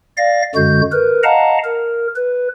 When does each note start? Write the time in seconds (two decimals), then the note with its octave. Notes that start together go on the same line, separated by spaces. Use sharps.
0.17 D5 F5 A#6
0.55 F#2 D3 G#3 F#4 G6
0.92 A#4 B4
1.23 D#5 F5 F#5 A5 A#5
1.64 A#4
2.16 B4